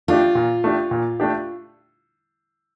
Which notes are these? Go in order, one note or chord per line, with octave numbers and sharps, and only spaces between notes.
A3 D4 F4 G4
A#2
A3 D4 G4
A#2
A3 D4 G4